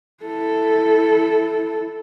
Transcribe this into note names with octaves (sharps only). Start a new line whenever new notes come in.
E4 A4